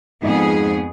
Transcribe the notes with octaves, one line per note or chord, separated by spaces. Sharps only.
F2 G#2 B3 G#4